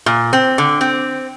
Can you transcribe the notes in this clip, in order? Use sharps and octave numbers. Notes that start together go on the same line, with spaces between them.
A#2
C4
D3
C4